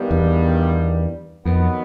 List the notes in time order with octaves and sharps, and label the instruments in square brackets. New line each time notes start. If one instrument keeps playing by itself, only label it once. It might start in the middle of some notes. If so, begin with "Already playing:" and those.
Already playing: [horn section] G2 D#3 G3 B3
[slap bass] E2
[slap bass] F2 [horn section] D#3 F#3 B3